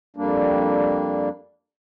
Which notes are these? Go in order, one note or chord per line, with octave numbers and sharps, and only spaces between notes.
F2 G3 A#3 D4